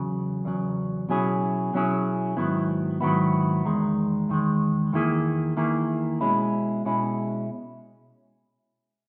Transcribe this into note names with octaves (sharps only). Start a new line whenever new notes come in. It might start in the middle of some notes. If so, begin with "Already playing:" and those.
Already playing: E2 C#3 F#3
E2 C#3 F#3
B2 F#3 C#4 E4 G#4
B2 F#3 C#4 E4 G#4
G#2 D#3 F#3 B3 E4
G#2 D#3 F#3 B3 E4
E2 D#3 G#3
E2 D#3 G#3
E2 D#3 A#3 E4 G#4
E2 D#3 A#3 E4 G#4
B2 G#3 C#4 E4
B2 G#3 C#4 E4